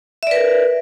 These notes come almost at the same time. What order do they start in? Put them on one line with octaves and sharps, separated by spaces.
E5 D5 B4 A#4